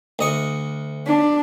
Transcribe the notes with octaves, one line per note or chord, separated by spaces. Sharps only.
D2 D#5 C#6
D4